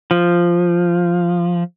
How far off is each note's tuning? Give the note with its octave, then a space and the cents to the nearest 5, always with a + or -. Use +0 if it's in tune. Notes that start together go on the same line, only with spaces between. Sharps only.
F3 -5